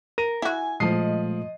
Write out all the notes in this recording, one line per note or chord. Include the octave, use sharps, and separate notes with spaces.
A#4 D#7
E4 F#4 G#5
A#2 F3 G#3 A3 D#5 C7